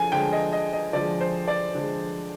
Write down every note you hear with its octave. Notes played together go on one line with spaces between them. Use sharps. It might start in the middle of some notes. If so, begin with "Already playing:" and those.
Already playing: D3 F3 G#3 G#5
D3 F3 G#3 G5
D#5
D#5
D#5
D3 F3 G#3 D5
C5
D5
D3 F3 G#3